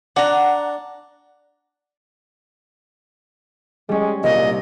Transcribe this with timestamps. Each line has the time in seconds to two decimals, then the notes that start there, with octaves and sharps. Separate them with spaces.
0.16 D4 F#5 A#5
3.89 G3 G#3 C#4
4.24 C2 A#2 D#5